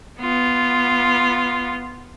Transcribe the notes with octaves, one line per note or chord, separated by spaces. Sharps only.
B3 F4